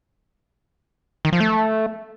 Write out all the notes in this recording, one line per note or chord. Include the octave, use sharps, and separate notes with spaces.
D#3
F3
A3